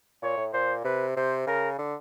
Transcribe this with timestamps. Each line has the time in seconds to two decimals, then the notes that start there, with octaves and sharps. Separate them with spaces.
0.22 A#2 C#5
0.37 A2
0.53 A#2 C5
0.84 C3 B4
1.16 C3 C5
1.47 C#3 A#4
1.78 D3